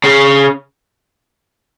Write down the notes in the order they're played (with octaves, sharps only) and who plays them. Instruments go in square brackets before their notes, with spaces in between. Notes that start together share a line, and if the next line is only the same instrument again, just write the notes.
[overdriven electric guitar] C#3